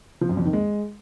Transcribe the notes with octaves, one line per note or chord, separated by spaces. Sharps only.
F3
F#2
F2
D#3
G#3